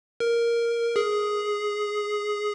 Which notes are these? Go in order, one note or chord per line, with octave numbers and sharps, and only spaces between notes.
A#4
G#4